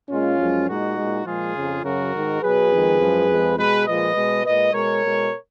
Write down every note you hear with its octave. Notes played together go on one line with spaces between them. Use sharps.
A#2 G#3 C#4 F4
F#2 F3 G#3
A#2 G#3 D#4 F#4
A#2 G#3
A#2 F3 G#3 F4 G#4
F2 C#3 F3
F#2 C#3 F#3 F#4 A#4
G#2 D#3 G#3
B2 F#3 G#4 B4
F2 D#3 G#3
F#2 F3 G#3
F2 F3 G#3
B2 G#3 G#4 B4
A#2 F3 G#3 B4 D#5
B2 G#3
A#2 G#3 B4 D#5
B2 G#3 A#4 C#5
B2 G#3